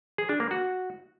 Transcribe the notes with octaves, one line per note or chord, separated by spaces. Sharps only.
G#4
D4
A#3
F#4